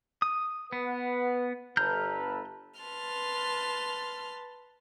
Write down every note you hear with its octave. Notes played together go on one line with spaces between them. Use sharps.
D#6
B3 B4 F#5
G1 A4 B4 A#5 F6 G6
B4 A5 C6 F6